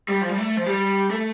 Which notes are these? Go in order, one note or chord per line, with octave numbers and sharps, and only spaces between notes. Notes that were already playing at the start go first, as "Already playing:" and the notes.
G3
F3
G3
A3
F3
G3
A3